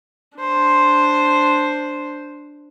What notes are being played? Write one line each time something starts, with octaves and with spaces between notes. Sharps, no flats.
D4 C5